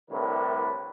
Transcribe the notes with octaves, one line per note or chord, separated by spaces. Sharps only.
C2 A2 D3 A#4 B4